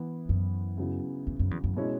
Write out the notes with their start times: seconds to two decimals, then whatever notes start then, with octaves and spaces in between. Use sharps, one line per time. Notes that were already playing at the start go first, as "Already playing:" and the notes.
Already playing: E3 B3 E4
0.29 F#2
0.77 C#3 F#3 B3 E4
1.27 E2
1.39 F#2
1.51 E2
1.64 F#2
1.76 B2 G#3 C#4 E4